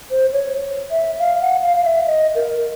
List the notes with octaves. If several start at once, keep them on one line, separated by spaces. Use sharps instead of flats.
C5
C#5
E5
F5
F#5
F5
F5
E5
D#5
A#4